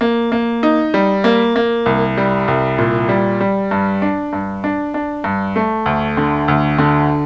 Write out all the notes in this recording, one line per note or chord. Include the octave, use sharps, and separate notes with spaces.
A#3
A#3
D#4
G3
A#3
A#3
C2
G3
C2
A#2
G3
G3
G2
D4
G2
D4
D4
G2
A3
D2
D3
D2
D3